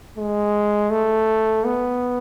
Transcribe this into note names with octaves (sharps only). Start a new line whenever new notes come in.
G#3
A3
B3